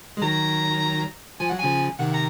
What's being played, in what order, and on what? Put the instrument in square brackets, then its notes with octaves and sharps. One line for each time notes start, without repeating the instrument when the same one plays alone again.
[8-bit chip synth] G#3
[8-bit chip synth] D#3 F#3 [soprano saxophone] A#5
[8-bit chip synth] F3 [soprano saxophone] G#5
[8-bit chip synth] F#3 [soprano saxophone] F#5
[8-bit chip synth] C#3 F3 [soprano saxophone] G#5
[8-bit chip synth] C3 D#3 [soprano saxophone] F#5
[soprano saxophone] A#5